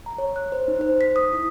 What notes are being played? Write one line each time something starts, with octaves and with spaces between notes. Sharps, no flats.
A#5
C#5
F#6
C5
D#4
C5
B6
D#6
E4